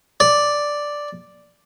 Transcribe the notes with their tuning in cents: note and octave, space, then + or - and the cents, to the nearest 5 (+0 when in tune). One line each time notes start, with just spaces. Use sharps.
D5 +0